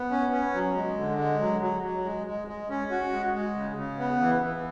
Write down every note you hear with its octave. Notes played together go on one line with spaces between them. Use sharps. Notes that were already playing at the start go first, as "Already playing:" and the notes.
Already playing: B3
C#4
C#4
F#3
G#3
D3
G#3
F#3
F#3
F#3
G#3
G#3
G#3
C#4
F#4
G#3
G#3
C#3
C#3
B3
E3
E3